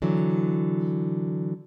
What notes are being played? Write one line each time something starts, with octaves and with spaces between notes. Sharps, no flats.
D3 E3 F#3